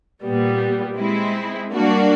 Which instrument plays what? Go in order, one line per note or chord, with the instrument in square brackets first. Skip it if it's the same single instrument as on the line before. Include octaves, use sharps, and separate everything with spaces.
[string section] A#2 G3 B3
G#3 C4 E4
G3 A#3 D4 F#4